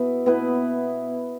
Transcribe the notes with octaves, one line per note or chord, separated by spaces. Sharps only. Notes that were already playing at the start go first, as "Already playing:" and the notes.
Already playing: B2 B3 E4 B4
B2 B3 E4 B4